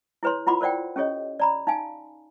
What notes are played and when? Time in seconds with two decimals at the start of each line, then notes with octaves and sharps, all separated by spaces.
0.23 E4 G#4 B4 C#5 C6
0.47 E4 F4 F#5 B5 C6 D6
0.61 A#4 C5 D5 F#5 G5
0.96 C#4 G4 A4 C#5 D#5
1.40 D5 A#5 B5
1.67 D#4 F5 G#5